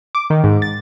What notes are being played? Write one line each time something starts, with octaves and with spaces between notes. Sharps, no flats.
D6
D#3
G#2
A6